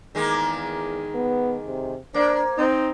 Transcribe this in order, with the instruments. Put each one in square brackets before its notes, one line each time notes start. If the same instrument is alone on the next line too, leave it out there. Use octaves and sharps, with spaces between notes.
[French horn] E2 [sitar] D#3 G#3 A#3
[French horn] B3
C3
[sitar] A#3 [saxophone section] D4 [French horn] C5
[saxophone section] C4 D#4